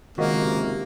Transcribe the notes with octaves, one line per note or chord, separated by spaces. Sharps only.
C#2 G#2 C3 D#3 A#3 F#4 A#4 D#5